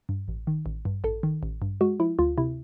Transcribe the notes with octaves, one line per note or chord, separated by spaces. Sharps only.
G2
A1
D#3
A1
G2
A1 A4
D#3
A1
G2
G#3 F#4
F3 E4
D2 F4
C3 E4